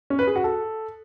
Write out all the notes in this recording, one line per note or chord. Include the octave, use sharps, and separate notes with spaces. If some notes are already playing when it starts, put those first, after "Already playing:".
C#4
B4
G#4
F#4
A4